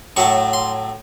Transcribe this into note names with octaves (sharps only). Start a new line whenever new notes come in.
A2 F#3 A3 C#6
C6